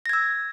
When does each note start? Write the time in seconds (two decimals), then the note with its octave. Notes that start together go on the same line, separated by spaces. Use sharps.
0.06 A#6
0.09 G#6
0.13 E6